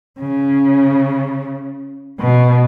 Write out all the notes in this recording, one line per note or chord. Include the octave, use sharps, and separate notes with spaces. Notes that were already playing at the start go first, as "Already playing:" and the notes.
C#3
B2